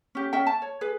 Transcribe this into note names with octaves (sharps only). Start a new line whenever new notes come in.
C#4 G4
C#4 D#5 E5 G5
A5
C#5
G#4 B4